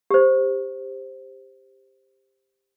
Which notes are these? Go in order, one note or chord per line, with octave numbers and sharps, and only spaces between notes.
G4 C5